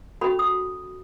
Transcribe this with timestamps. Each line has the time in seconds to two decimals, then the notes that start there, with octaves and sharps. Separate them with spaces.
0.21 C#4 F#4 A4 B5
0.39 D#6